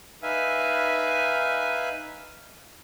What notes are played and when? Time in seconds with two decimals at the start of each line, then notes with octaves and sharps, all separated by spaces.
0.23 D#4 B4 E5 F5 G#5